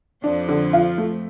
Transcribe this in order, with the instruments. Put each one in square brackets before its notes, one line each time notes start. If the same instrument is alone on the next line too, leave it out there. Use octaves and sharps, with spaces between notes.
[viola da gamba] F2 F3 [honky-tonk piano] D4
[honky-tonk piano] D3
F4
A3